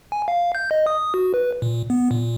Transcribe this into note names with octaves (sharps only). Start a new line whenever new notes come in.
G#5
F5
G6
D#5
D#6
F#4
B4
A#2
B3
A#2